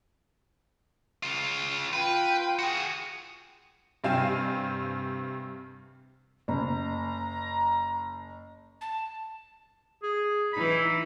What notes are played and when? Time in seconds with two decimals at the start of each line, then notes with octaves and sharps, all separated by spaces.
1.23 C#3 F4
1.93 F4 B4 G5
2.59 F#4 G#4
4.04 G2 C3 F5 G5 G#5 E7
6.48 F#1 A#5
8.81 A5
10.03 G#4
10.53 E3 D#4 B5